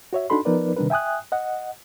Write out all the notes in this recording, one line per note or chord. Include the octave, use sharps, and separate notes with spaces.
F#4 C#5 E5
D4 D#4 F#4 A4 B5 C6
F3 B3 D#4 A#4 B4 D5
C3 D#3 G3 D4 A#4 B4
E5 G5 G#5 D#6 F#6
D#5 F#5